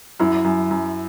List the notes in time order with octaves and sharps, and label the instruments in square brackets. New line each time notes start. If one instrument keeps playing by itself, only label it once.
[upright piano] F#2 [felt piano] E4
[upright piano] F#2
F#2